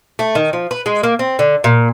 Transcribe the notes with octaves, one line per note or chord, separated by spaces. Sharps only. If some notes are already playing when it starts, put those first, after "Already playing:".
A3
D#3
F3
B4
G#3
A#3
C4
D3
A#2